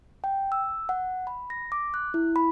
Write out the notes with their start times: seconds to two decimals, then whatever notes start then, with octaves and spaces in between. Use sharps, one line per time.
0.24 G5
0.52 E6
0.89 F#5
1.27 B5
1.50 A#6
1.72 D6
1.94 F#6
2.14 E4
2.36 B5